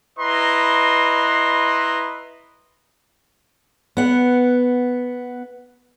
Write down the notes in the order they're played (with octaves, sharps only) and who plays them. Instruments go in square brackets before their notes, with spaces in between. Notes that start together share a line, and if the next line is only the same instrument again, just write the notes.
[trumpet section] E4 B4 D#5 A#5 C6
[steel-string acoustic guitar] B3 F#5